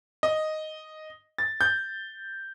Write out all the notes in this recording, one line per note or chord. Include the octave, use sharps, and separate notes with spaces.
D#5
A6
G6